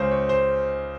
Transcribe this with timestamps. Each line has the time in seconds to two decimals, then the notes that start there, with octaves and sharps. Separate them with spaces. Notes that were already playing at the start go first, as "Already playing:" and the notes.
Already playing: C#2 C#3 G#3 C5 C#5
0.11 C#5
0.29 C5